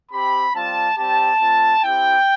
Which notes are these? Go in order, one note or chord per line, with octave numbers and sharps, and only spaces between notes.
C4 G4 B5
G3 C4 F4 A5
G3 C4 G4 A5
A3 C4 F4
C4 E4 G4 G5